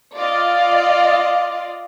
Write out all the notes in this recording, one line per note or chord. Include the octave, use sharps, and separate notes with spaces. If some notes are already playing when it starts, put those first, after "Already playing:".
F4 D5 D#5 F5